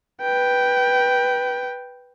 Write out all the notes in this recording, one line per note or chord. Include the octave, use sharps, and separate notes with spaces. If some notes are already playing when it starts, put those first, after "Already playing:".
B4 G5